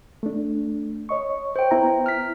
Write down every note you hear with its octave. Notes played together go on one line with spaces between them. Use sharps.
A3 D4
C#5 D#5 C#6
C5 G5
B3 E4 A#5
F6 B6